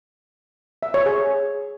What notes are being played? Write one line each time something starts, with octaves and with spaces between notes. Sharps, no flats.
E5
C#5
G#4